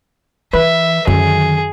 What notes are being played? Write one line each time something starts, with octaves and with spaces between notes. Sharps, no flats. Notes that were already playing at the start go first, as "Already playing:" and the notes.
E3 B4 E5
F#2 D3 D#3 G#4